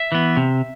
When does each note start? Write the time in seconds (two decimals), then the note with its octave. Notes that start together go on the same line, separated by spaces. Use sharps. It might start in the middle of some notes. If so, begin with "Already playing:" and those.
Already playing: E5
0.12 E3 B3
0.37 C3